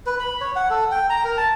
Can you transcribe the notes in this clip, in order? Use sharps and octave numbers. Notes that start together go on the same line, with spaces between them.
B4
B5
C#5
F#5
A4
G5
A#5
A#4
A5